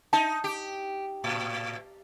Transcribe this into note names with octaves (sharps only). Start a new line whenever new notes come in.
D#4 A5
G4
A2